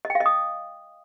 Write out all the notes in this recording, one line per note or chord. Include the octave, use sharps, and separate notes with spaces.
D#5
G5
F5
D#5
D#6